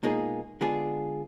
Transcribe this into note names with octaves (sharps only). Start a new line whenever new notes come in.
B2 G#3 A#3 D#4 F4 G#4
D3 G#3 B3 D4 F4 G#4